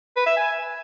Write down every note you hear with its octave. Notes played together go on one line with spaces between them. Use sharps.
B4
E5
G#5